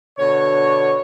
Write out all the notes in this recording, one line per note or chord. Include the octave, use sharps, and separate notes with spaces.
B2 D3 C#5